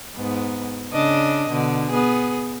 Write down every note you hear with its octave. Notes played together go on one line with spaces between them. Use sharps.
G#2 B3
C#3 D4 D#5
B2 D3
B3 G#4